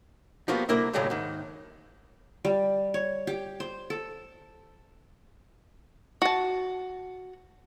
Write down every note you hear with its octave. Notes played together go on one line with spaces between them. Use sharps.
F3 G3 A#3 B3 F4 F#4
C2 D3 A#3 E4 A#4 E5
D#2 A2 C#3 F#3 G3 A3
G#2 D#3
G3
C#5
G4
C5
A4
F#4 A5